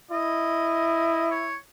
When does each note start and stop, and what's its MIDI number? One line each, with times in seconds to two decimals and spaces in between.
0.11 1.59 64
0.11 1.28 75
1.31 1.55 73